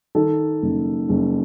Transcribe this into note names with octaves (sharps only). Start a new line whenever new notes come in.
D#3 A4
F#1
F#1